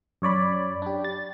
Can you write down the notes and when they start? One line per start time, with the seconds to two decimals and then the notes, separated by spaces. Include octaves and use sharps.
0.22 F#2 C#5 D5 B5
0.82 D4 G4
1.04 A6